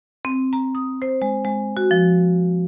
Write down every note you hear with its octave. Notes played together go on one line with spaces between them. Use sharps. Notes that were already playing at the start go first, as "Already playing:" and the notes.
C4
A#5
D#6
C5
G#3
G#3
F#4
F3